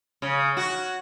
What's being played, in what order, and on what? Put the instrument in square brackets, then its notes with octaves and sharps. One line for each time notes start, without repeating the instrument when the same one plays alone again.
[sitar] C#3
F#4